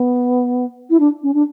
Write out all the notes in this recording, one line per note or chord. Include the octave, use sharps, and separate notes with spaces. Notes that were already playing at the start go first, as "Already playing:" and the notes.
Already playing: B3
E4
D4
C#4
D4